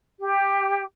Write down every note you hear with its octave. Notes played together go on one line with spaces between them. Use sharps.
G4